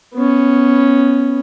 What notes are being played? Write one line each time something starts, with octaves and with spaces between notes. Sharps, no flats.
B3 C#4